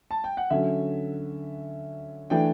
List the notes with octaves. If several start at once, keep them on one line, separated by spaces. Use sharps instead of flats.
A5
G5
F#5
D3 F#3 C#4 E5
E3 A3 D4 G5